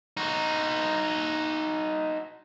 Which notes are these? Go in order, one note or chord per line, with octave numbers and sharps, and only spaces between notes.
D#4 F#4